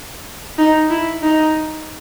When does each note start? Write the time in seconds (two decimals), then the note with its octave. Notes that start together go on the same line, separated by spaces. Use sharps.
0.58 D#4
0.90 E4
1.23 D#4